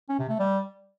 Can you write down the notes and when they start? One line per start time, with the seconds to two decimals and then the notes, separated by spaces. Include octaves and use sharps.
0.09 C#4
0.19 C3
0.29 A3
0.39 G3